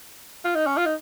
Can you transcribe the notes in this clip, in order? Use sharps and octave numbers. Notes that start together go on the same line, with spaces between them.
F4
D#4
C#4
F4
D#4